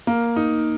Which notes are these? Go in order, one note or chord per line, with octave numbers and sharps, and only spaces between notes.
A#3
D#4